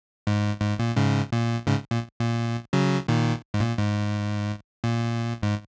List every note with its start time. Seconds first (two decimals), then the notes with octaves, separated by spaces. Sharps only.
0.27 G#2
0.61 G#2
0.79 A#2
0.96 G#2 C#3
1.32 A#2
1.67 G#2 C#3
1.91 A#2
2.20 A#2
2.73 C#3 F#3
3.08 A#2 D#3
3.54 G#2
3.60 A#2
3.78 G#2
4.84 A#2
5.43 G#2